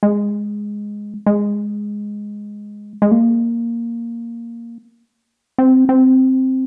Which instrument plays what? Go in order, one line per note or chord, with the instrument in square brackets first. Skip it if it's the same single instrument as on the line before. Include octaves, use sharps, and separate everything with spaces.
[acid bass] G#3
G#3
G#3
A#3
C4
C4